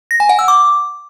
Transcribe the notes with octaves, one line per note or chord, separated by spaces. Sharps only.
A#6
G#5
F#5
E6
D6